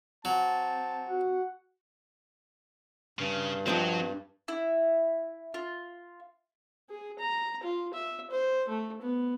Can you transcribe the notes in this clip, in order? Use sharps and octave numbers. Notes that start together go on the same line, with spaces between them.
F#3 C4 A5
F#4 F#5
G2 C#3
F3 F#3 C4 D#5
E4
F4
G#4
A#5
F4
E5
C5
A3
B3